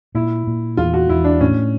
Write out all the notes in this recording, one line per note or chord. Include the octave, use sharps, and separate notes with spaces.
A#2 E4
A#2
E2 F4
F#4
E2 E4
D4
A2 C#4